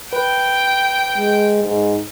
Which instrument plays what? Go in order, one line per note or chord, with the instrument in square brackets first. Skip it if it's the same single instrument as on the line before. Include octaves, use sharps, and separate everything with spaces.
[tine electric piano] B4 [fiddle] G5
[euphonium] G#3
G#2